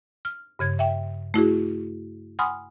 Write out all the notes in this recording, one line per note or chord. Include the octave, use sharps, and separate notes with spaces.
F6
G2 C#3 G#6
E5 G5
A3 E4 F#4 G#4
F#5 G#5 B5 C6 D#6 F6